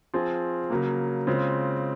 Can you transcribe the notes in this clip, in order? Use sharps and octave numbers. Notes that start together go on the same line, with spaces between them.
F3 C4 F4 G#4
C#3 F#3 A#3
C#3 G#3 C4 F4